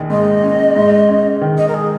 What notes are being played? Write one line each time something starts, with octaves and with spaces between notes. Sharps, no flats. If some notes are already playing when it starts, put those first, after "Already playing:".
Already playing: A#1 D#3
G#2 D#5
C#4
G#2
C#4
D#3
D#5
A#4
G#4